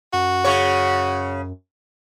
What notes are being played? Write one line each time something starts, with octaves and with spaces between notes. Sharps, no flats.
F#2 F#4
C#3 C#5